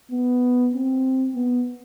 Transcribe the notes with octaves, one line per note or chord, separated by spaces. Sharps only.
B3
C4
B3